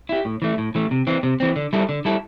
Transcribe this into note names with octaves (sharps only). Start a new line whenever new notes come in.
E4 G4
A2
E3 A3
A2
E3 A3
C3
E3 C4
C3
E3 C4
D3
G3 E4 A4
D3
G3 E4 A4